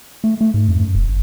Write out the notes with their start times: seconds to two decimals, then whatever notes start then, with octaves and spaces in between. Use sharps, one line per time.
0.24 A3
0.41 A3
0.54 G#2
0.69 F2
0.80 F#2
0.95 E1
1.10 G1